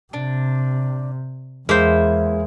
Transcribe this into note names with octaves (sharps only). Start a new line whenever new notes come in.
C3 D4
E2 G#3 A#3 E4 C5